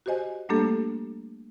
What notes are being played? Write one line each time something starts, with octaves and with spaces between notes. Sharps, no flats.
F#4 G4 C5 D#5 G#5
G3 A3 A#3 D4 G4 A4